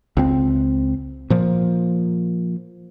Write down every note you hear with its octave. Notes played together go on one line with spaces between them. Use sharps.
C#2 C4
A#2 F3